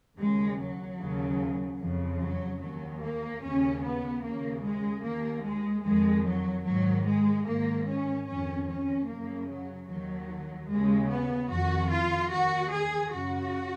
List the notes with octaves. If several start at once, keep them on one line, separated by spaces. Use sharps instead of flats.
D#2 C#3 G#3
F#3
D#2 C#3
F2 C#3
F#3
D#2 D#3 F#3
A#3
D#2 C#3 C#4
B3
D#2 C#3 A#3
G#3
D#2 D#3 A#3
G#3
F2 D#3 G#3
F#3
G#2 D#3 F#3
G#3
G#2 D#3 A#3
C#4
F2 D#3 C#4
C#4
F#2 C#3 A#3
F#3
D#2 D#3 F#3
D#2 C#3 G#3
B3
F2 D#3 F#4
F4
D#2 D#3 F#4
G#4
F#2 C#3 F#4